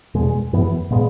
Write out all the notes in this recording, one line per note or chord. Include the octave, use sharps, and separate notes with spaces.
E2 B2 G#3
F#2 E3 B3
A#2 G#3 B3